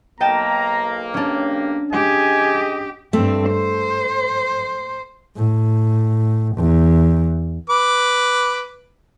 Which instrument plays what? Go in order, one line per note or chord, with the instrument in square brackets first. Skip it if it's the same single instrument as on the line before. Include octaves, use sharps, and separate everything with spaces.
[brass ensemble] B1 A#3 [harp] D#5 G5 A5 [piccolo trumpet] A#5
[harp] C#4 D4 [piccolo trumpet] G4
[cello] G4 [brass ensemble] G#4 D#5 [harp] F#5 [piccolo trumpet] G#5
[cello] G2 C4 [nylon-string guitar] A3
[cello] C5
[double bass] A2
E2
[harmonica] B4 D6